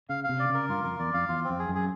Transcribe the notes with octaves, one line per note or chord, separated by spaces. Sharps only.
C#3 F5
F5
C3
D5
C#3 A#4
G2 F4
F2 A#4
E2 D5
F2 F5
E2 F4
C4
F2
G#4
F#2
G#4